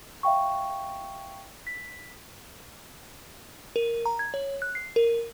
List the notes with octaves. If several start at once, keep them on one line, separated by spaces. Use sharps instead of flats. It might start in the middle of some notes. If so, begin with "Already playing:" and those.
E5 F5 G5 C#6
B6
A#4
A#5
G#6
C#5
F#6
C7
A#4